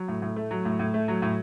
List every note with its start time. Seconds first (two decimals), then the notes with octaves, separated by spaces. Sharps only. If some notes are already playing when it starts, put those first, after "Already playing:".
Already playing: F#3
0.08 A2
0.22 A2
0.36 A3
0.51 F#3
0.65 A2
0.79 A2
0.94 A3
1.08 F#3
1.22 A2